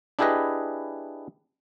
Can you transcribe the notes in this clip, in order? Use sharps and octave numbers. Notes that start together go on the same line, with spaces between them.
D4 E4 G4 G#4 B4 D#5